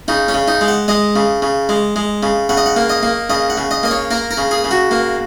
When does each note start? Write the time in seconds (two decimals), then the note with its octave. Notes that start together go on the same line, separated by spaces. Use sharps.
0.08 C#3 D#4
0.28 C#4
0.34 C#3
0.48 D#4
0.61 G#3
0.68 F#5
0.88 G#3 D#5
1.16 C#3
1.42 C#3
1.69 G#3
1.96 G#3
2.23 C#3
2.49 C#3 F#5
2.57 D#5
2.66 F#5
2.76 A#3
2.90 D#5
3.03 A#3
3.30 C#3 D#5
3.50 F#5
3.57 C#3
3.71 D#5
3.83 A#3 D#5
3.91 C#5
4.11 A#3 A#4
4.31 A#4
4.37 C#3
4.51 G#4
4.64 C#3
4.71 F#4
4.91 A#3